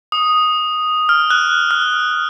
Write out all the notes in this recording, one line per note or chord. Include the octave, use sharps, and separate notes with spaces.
D#6
F6
F#6
F6